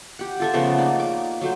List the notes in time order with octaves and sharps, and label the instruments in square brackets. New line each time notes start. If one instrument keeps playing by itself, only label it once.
[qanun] G4 F#5
F4 A4 E5
C#3 F3 A3 B3
A#3 D#4 D5
D6
F#3 A3 C5